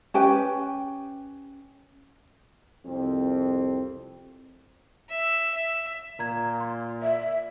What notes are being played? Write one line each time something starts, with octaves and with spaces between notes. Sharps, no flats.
C#4 G4 B4 G5
C2 F2 C4
E5
E5
A#2 A#5 G#6
C6
D5 E5